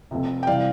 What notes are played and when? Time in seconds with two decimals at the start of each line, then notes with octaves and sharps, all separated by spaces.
0.11 F1 F2 C3
0.43 G5
0.47 C3 E3 G3 D5 F5